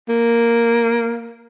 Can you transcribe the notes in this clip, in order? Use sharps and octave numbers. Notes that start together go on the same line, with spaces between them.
A#3